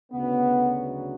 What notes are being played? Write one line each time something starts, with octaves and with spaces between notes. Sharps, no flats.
D2 C#3 F#3 B3